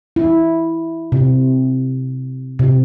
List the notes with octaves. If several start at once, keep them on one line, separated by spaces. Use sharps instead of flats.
E4
C3
C3